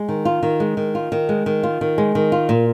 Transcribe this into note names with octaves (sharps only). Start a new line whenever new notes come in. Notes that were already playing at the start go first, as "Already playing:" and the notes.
Already playing: G#3
D#3
F4
D#3
G#3
D#3
F4
D#3
G#3
D#3
F4
D#3
G#3
D#3
F4
A#2